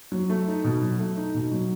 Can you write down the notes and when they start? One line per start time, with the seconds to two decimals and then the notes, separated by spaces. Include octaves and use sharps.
0.12 F#3
0.30 A3
0.47 D#4
0.64 B2
0.82 F#3
0.99 A3
1.17 D#4
1.34 B2
1.52 F#3